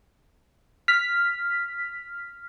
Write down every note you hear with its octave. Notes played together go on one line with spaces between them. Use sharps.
F6 B6